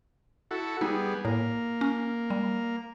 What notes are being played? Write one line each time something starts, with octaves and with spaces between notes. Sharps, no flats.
E4 F#4 A4
G3 B3 D#4 G#4
A2 A#3
C#4
G3